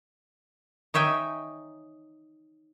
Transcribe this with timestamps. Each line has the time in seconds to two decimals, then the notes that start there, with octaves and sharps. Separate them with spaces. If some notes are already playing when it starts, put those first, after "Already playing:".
0.94 D#4 C#5 E5 G5 G#5